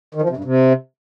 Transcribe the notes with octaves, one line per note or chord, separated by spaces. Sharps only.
D#3
F3
C3
G2
C3